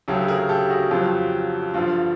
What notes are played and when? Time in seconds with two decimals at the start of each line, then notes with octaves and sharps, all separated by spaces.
0.08 D2 C#3 F#3 G4 A4
0.28 G#4 A#4
0.49 G4 A4
0.70 F#4 G#4
0.91 F2 C#3 F#3 F4 G4
1.74 G2 D3 F3 F4